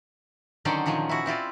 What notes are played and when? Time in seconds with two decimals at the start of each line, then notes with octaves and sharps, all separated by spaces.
0.65 D3 D#3 F#3 C#4 C5 D5
0.86 A#2 D#3 F3 F#3 G#4
1.09 E4 F#4
1.26 C4 E4 F4 D5